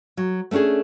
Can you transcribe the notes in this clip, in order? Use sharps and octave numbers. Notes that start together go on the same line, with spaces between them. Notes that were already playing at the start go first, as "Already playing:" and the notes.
F#3
A3 B3 C#4 D4 G#4